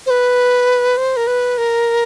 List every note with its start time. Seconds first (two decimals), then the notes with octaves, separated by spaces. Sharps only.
0.06 C5
0.10 B4
0.97 C5
1.17 A#4
1.27 B4
1.58 A#4